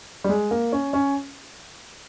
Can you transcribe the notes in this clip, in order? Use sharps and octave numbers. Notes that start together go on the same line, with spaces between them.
G3
G#3
A#3
C#4
C#4